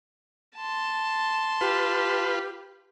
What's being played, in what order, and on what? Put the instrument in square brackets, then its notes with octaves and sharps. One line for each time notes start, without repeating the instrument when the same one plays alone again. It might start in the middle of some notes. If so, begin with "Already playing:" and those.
[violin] A5 C6
[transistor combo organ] F4 B4 [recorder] G4